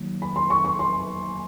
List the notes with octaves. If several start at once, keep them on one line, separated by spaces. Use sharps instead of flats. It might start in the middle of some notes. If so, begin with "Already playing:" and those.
Already playing: D#3 F#3 A#3
B5
C6
C#6
C#6
C6